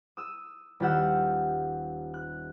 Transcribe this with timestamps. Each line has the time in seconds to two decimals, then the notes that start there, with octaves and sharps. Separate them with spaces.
0.17 D#6 E6
0.80 D#1 F4 G4 F#5 E6
2.14 F#6